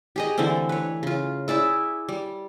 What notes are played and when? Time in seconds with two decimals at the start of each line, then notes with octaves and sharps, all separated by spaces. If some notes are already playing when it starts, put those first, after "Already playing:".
0.16 G4 G#4 D#5
0.38 D3 E3 A3 C4
0.69 B4 C#5
1.03 C#3 F4
1.48 E4 G#4 D5 E5
2.09 G3